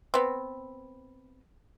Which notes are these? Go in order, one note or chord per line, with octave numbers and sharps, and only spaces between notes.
B3 C4